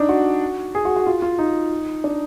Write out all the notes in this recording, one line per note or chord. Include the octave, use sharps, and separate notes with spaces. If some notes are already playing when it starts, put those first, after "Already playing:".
Already playing: D4 D#4
F#4
G#4
F#4
F#4
F4
F4
D#4
D4